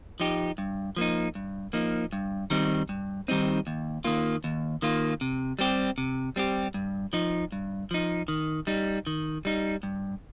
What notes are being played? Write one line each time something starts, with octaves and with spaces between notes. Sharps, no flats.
F3 D#4 G4
G2
F3 A#3 D#4
G2
F3 A#3 D#4
G2
D#3 G3 C4 D#4
G2
D#3 G3 C4 D#4
D#2
D#3 A#3 F4
D#2
D#3 A#3 F4
C3
G3 C4 G4
C3
G3 C4 G4
G2
F3 D#4
G2
F3 D#4
D#3
G3 D#4
D#3
G3 D#4
G2